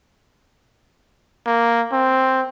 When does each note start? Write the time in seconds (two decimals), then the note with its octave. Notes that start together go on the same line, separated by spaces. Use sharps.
1.46 A#3
1.92 C4